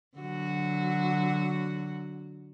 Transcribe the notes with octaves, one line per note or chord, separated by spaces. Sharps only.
D3 F#3 F#4